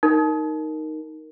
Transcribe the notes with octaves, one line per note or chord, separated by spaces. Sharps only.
D#4 A#4